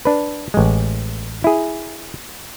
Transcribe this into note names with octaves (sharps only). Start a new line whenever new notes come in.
D4 B4
A1 G#3
E4 G#4